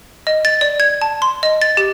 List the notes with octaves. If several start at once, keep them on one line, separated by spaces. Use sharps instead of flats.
D#5
A6
D5
G#6
A5
C6
D#5
A6
G4